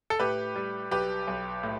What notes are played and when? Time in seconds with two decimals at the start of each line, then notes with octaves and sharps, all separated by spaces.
0.10 A4
0.19 A2 G4 B4
0.56 G3
0.91 B1 G4 B4
1.27 B1
1.63 A2